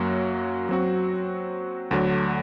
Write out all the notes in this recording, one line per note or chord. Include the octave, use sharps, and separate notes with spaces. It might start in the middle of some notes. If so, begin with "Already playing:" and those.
Already playing: F#2 F#3 A#3 F#4
F#3 C4 F#4
D2 D3 F#3